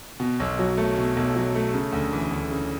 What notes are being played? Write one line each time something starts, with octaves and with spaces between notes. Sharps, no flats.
B2
B1
F#3
A3
B2
B1
F#3
A3
C#3
D2
E3
D2
C#3